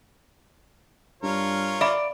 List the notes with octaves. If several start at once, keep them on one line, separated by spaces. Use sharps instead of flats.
G2 F4 A#4 C#5
D5 E5 F5 B5